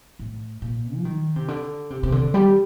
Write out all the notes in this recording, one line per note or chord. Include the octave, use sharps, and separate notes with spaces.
A2
A#2
F#3
D#3
C3
D3
C3
C3
D3
G3